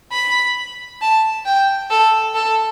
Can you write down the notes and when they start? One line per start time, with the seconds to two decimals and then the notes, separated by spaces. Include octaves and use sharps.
0.12 B5
1.01 A5
1.46 G5
1.90 A4
2.35 A4